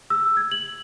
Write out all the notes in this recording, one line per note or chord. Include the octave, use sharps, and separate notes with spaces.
E6
G#6
F#7